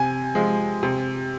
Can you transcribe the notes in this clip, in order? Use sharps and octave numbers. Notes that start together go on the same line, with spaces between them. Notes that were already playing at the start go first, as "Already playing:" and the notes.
Already playing: C3 G#5
F3 G#3
C3